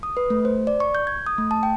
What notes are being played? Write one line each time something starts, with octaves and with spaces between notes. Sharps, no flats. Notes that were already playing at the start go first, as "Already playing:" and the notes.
D#6
B4
A3
C5
D5
C#6
G6
G#6
D#6
A3
A5
G5